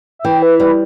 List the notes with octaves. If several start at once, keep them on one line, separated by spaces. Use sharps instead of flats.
E5
E3 G5
B4
G3 B4